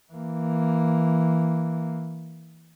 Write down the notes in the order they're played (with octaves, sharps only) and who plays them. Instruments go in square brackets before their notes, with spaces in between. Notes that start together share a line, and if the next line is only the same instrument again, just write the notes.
[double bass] E3 A#3